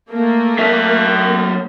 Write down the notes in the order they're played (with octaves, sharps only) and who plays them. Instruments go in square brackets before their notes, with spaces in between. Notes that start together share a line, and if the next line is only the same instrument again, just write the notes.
[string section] A3 A#3
[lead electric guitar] F#3 E5